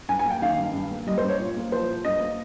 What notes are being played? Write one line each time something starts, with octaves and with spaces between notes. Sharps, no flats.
G2 G#5
G#5
A#3
G5
D#3 F5
G2
G2
A#3
G3 D#5
C5
G2
C#5
A#2
A#3
F3 C5
A#2
G2 D#5
A#3